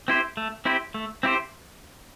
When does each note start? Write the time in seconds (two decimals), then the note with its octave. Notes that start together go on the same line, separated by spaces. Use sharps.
0.08 C4 E4 G4 C5
0.37 A3
0.65 C4 E4 G4 C5
0.94 A3
1.23 C4 E4 G4 C5